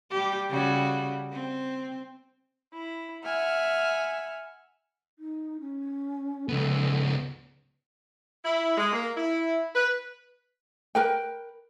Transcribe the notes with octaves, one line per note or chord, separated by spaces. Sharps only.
G3 G4
C#3 G3 F#4
C4
E4
E5 F#5 G#5 B5 F6
D#4
C#4
C#2 B3 A4
E4
G#3
A#3
E4
B4
A#4 B4 G5